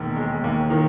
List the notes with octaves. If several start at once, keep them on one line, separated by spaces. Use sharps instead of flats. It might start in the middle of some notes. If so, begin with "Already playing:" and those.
Already playing: E1 D#2 D#3
G#3
D#2
D#3